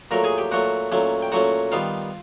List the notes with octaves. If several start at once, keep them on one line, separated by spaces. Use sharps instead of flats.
A#2 F#3 A3 A#4 A#5
G#4 G#5
G4 G5
A#2 F#3 A3 F#4 F#5
A#2 F#3 A3 C#4
G5
A#2 F#3 A3 C#4 F#4 F#5
D#3 G3 B3 F4 F5